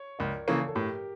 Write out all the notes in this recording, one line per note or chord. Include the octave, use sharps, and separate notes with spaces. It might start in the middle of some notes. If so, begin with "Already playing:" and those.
Already playing: C#5
C#2 A#4 D5
C#3 E3 A#3 A4 C#5
A4
A2 G4 A#4